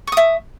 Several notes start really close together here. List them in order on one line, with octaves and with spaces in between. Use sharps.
C#6 D#6 E5